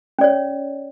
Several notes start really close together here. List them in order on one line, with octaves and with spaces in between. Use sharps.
C#4 D5 C#5